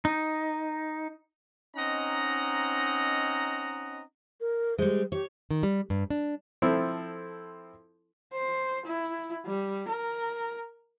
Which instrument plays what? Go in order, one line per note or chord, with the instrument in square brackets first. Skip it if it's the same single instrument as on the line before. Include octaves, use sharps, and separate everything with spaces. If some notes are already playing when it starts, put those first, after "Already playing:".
[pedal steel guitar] D#4
[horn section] C4 C#4 D#4 D#5 F#5 A#5
[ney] A#4
[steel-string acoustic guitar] G3 G#3 [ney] C5
[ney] G4 [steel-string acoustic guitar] C#5
[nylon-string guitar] D#3
G3
G2
D4
[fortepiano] F3 C4 E4 A4
[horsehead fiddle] C5
E4
G3
A#4